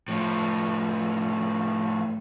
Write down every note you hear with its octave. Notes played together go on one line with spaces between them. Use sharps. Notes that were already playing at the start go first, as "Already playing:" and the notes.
A2 F3